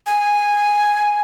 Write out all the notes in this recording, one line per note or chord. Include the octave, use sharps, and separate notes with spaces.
G#5